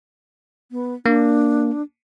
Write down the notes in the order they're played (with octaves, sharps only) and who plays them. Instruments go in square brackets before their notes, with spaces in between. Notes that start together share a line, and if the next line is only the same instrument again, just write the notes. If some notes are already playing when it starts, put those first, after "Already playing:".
[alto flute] B3
[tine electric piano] A#3 [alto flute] D4